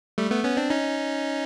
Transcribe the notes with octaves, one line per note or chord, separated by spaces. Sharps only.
G3 A3
A3 B3
B3 C#4
C4 D4
C#4 D#4